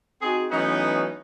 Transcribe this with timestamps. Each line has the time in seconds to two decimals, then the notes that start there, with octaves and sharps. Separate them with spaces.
0.22 C4 D#4 F#4 G#4
0.51 E3 F#3 A3 B3 C#4 D#4